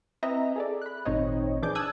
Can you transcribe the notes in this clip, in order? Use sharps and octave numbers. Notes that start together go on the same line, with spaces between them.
C4 E4 B4 D#5 E5 A#5
G#4 A4 D5
B5 F#6
G#1 A#2 C4 D#4 C#5 D#5
E3 D4 G#4 D6 G6
A5 D#6 E6 F#6 G#6